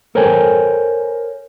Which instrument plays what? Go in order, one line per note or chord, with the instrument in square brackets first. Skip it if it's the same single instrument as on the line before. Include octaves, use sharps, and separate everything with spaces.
[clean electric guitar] A4 A#4 C5 C#5 G5 G#5